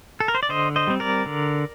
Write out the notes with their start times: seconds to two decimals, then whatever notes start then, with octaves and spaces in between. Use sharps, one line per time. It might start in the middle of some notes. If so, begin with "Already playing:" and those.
0.20 A4
0.28 A#4
0.35 C5
0.43 D5
0.49 D3 C5 D#5
0.76 C5 D#5
0.87 G3 C4
1.00 A#4 D5
1.26 D3